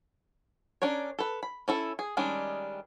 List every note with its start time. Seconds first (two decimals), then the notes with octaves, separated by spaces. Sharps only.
0.82 C#4 D4 A#4 C#5
1.19 A4 B4
1.43 B5
1.68 C#4 E4 A4
1.99 G#4
2.17 D#3 G3 G#3 C#4 D4